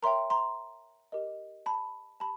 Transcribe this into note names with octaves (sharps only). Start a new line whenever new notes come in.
A#4 C#5 E5 G5 A#5 C6
A#5 C6
G4 A#4 D#5
A5 B5
G4 A5 B5